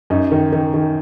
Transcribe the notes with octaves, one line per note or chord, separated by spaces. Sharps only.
F#2 D#4
D#3
D#3
D#3